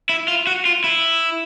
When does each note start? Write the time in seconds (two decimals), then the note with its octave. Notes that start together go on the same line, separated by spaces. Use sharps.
0.09 E4
0.28 F4
0.47 F#4
0.66 F4
0.84 E4